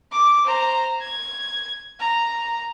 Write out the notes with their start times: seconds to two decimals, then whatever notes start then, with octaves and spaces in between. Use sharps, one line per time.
0.12 D6
0.45 C5 A#5
1.01 G#6
2.00 A#5